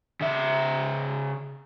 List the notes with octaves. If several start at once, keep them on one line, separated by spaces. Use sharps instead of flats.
C#3 E5